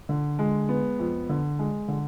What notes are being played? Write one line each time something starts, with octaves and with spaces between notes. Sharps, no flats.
D3
G#3
B3
F2
D3
G#3
D3